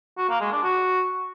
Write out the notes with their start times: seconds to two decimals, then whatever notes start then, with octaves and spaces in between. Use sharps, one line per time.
0.18 F#4
0.29 A#3
0.41 G#3
0.52 D4
0.63 F#4